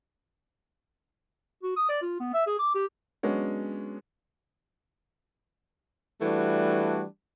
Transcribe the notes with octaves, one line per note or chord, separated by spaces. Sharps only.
F#4
D#6
D5
F4
B3
E5
G#4
D6
G4
F#3 G#3 B3 C#4 D4 C#5
E3 G3 A3 D4 F#4